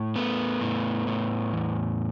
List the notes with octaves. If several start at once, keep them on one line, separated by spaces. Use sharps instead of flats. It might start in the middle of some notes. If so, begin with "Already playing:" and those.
Already playing: A2
A3 B3
A2
A2
E2